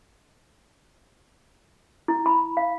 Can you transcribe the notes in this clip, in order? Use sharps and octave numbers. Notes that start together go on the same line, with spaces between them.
E4
B5
F5